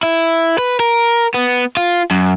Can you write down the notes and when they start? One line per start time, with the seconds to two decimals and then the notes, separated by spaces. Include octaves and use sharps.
0.03 E4
0.58 B4
0.80 A#4
1.34 B3
1.77 F4
2.11 F#2